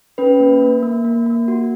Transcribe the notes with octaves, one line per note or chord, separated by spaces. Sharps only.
C#4 B4
A#3
A#3
A#3
A#3
A#3
F#4